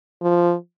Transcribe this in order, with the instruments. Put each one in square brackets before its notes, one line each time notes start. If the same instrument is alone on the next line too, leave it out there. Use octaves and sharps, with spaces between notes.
[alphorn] F3